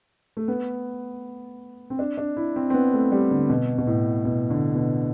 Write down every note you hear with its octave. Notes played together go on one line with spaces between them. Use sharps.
A3
B3
C4
D4
D4
E4
C4
C4
B3
A3
G3
D3
B2
B2
A2
B2
D3
B2